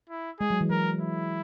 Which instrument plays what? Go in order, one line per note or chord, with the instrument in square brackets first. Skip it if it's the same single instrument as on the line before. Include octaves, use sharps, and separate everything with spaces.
[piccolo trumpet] E4
[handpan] G#3 [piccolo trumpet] G#4
[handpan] F#3
E3
[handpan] F#3 [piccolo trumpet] A#4
[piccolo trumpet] E4